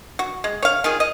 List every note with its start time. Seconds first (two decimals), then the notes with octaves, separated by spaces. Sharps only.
0.19 F#4
0.44 G#3
0.62 C#5 F5
0.84 D#3 F4 G#4
1.00 D#5